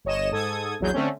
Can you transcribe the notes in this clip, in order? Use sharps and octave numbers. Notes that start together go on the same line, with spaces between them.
G1 C#5 D#5 E7
G#2 A4 D#6 G#6
A#1 E2 F#3 G#4 G6
D3 A3 C4 C#4